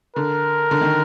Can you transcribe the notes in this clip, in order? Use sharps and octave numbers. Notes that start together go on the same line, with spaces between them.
D3 A#4
D3
D#3